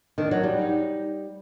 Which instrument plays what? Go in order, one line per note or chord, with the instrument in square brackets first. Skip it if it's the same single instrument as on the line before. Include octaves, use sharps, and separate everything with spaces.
[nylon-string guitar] D#3 [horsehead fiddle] D4
[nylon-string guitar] F#3
G3
[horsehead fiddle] D#4